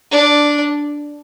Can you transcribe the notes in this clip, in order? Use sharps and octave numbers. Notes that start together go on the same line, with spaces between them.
D4